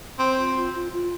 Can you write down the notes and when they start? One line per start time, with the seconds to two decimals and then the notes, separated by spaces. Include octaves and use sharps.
0.19 C4 C5
0.37 F4
0.55 F4
0.73 F4
0.91 F4